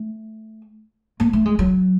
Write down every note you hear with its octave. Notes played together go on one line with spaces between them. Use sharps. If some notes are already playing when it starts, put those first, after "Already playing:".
Already playing: A3
A#3
A3
G#3
F#3